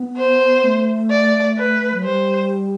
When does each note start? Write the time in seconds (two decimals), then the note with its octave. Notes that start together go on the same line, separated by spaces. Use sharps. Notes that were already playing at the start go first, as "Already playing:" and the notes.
Already playing: B3
0.17 C5
0.64 A3
1.11 D5
1.58 B4
1.94 F#3
2.04 G3 C5